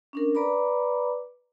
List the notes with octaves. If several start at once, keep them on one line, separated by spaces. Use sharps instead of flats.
C#4 D4 A#4
B4 D5 A#5 B5 D6